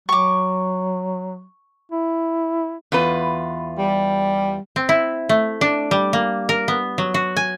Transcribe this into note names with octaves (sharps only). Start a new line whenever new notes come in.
F#3 C#6 D6
E4
E2 F4 B4
G3
C4
E4
A3
D4
G3
A#3
A#4
B3
F#3
F#4
G#5